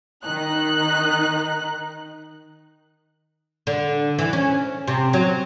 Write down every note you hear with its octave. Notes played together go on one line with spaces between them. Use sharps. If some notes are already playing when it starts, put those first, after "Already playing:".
D#3 D#4 F#6
D3
E3
C#4
C3
F#3